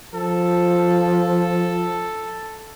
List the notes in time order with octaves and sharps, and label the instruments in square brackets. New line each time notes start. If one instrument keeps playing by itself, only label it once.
[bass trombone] F3 [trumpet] A4